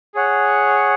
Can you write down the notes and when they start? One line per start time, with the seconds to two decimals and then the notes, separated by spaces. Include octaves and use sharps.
0.14 G#4 C#5 F#5